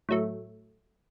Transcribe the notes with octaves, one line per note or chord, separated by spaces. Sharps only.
A2 F#3 A3